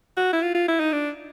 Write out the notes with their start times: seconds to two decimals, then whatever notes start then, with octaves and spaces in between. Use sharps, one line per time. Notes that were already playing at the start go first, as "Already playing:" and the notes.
0.17 F#4
0.33 E4
0.42 F4
0.55 F4
0.68 E4
0.80 D#4
0.92 D4